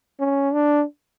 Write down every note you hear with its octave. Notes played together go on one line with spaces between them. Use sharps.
C#4
D4